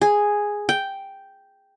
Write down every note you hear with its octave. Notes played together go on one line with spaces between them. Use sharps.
G#4
G5